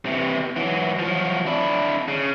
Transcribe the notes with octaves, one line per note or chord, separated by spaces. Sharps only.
C3 E3
E3 F#3
F3 F#3
D4 E4
C#3